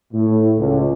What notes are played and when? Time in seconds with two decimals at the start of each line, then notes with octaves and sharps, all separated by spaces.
0.13 A2
0.58 C#2